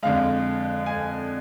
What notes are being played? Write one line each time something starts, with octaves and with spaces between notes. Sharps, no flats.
F2 D3 G#3 F5
G#5